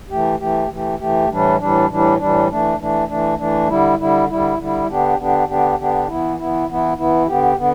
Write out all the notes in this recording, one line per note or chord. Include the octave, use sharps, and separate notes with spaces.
E3 A3 G4
E3 A3 G4
E3 A3 G4
E3 A3 G4
A2 E3 G3 D4
A2 E3 G3 D4
A2 E3 G3 D4
A2 E3 G3 D4
E3 A3 D4
E3 A3 D4
E3 A3 D4
E3 A3 D4
D3 G3 E4
D3 G3 E4
D3 G3 E4
D3 G3 E4
D3 B3 D4 G4
D3 B3 D4 G4
D3 B3 D4 G4
D3 B3 D4 G4
E3 B3 E4
E3 B3 E4
E3 B3 E4
E3 B3 E4
D3 B3 G4
D3 B3